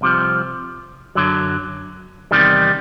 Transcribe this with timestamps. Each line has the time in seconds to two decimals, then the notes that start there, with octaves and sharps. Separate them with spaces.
0.01 C2 C3 F3
1.15 F#2 D3 F#3
2.31 E2 C3 D#3 G3